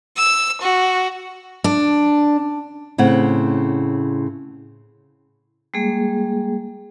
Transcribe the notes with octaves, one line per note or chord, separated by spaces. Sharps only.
E6
F#4
D4
A2 C#3 C4 F#5
G3 G#3 A#3 G#4